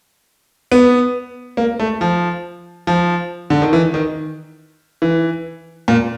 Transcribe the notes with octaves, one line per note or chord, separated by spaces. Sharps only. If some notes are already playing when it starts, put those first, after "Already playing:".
B3
A#3
A3
F3
F3
D3
D#3
E3
D#3
E3
A#2